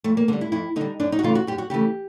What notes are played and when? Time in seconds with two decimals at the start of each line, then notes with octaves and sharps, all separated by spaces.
0.04 F2 A3
0.17 A#3
0.28 D3 G3 A#3
0.41 E4
0.52 F2 E4
0.76 D3 G3 D#4
1.00 F#2 D4
1.12 D#4
1.19 F#4
1.23 C#3 E3 A3 F4
1.35 F#4
1.47 F#2 G4
1.58 F#4
1.70 C#3 E3 A3 G4